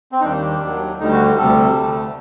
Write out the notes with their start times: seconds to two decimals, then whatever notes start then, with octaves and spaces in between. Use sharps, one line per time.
0.12 C4
0.21 D#4
0.24 D#2 D#3 G3 A#3 D4
0.63 D#2 D#3 F#3
1.00 D2 D3 G3 D#4
1.12 F#4
1.38 D2 C3 G3 A4
1.75 D2 D3 A3